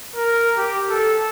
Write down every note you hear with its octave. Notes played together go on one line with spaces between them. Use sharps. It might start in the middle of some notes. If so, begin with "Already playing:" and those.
A#4
G4
A4